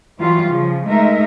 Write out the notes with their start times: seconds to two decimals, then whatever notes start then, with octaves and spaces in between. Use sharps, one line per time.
0.19 E3 F#3 G3 F4
0.50 C#3 F3
0.87 G#3 A3 D#4 A#4 E5